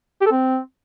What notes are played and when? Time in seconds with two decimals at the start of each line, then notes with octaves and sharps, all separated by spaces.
0.21 G4
0.26 A4
0.31 C4